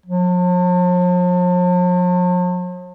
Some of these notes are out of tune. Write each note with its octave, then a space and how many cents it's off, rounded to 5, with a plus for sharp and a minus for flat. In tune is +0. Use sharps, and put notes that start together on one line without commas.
F3 +45